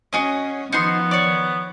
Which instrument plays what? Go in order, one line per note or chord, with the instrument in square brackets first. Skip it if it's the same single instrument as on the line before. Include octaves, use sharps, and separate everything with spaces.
[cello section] C#4 [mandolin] F#4 G#4 D#5
[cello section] D#3 F3 [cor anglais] B3 [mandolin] D#4 F#4 C6
[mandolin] C#5 D5